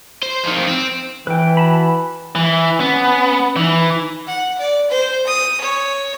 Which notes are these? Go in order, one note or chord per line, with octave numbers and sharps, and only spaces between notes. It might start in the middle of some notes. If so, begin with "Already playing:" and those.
C5
F2 D#3
C4
E3 B4 G5
F#4 A5 B5
E3
B3 C#4
E3 D#4
F#5
D5
C5
D#6
C#5